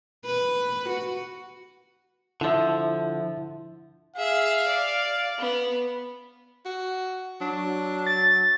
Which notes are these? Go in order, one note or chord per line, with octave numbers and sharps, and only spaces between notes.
B4
F#4
D3 F3 E4 E5
G#4 E5 F5
D5
B3
F#4
F#3 D4
A6